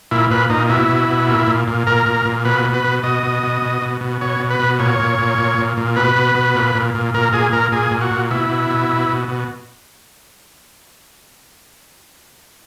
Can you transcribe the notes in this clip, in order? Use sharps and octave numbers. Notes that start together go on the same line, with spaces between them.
A#2 E4
A#2 B4
A#2 D#4
B2 E4
B2
B2
A#2
A#2
A#2
A#2 A#4
A#2
A#2
B2 B4
B2
B4
B2
B2 D#5
B2
B2
B2
B2
B2
B2 C#5
B2
B4
B2
A#2 C#5
A#2
A#2
A#2
A#2
A#2
B2 B4
B2
B2
A#2
A#2
A#2
A#2 A#4
A#2 G#4
A#2 A#4
A#2 G#4
A#2
F#4
A#2
B2 E4
B2
B2
B2
B2
B2